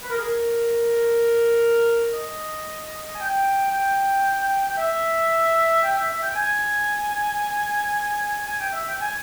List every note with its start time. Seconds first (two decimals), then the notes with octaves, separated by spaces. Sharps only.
0.02 B4
0.09 A#4
0.17 G#4
0.24 A#4
2.12 D#5
3.13 G#5
3.19 G5
3.71 G5
4.68 G5
4.77 E5
5.83 G5
5.96 E5
6.08 E5
6.22 G5
6.35 G#5
8.46 G#5
8.59 G5
8.73 E5
8.87 G5
9.00 G#5